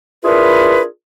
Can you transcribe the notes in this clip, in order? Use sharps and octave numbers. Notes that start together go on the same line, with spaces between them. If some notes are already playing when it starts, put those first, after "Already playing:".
D4 E4 F4 G#4 A#4 B4